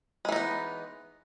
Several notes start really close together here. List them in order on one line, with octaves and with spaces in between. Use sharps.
G#3 E3 D#4 B3